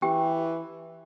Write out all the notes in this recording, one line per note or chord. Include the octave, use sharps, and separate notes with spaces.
E3 C#4 G4 G5